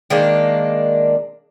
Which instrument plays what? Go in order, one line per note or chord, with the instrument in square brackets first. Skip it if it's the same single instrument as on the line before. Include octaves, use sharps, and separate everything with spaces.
[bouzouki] D#3 G#3 A#3 D4